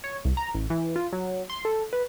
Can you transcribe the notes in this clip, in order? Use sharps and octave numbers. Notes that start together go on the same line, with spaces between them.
C#5
C2
A#5
A1
E3
F4
F#3
C6
A4
B4